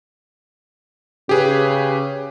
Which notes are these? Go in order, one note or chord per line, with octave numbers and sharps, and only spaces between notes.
C#3 G4 G#4 B4